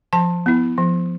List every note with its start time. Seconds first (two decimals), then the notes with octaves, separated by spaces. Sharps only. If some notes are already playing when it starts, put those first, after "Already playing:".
0.13 F3 A5
0.46 B3 E4
0.78 F3